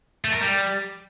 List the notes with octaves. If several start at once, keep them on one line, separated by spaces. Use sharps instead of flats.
A3
A#4
G3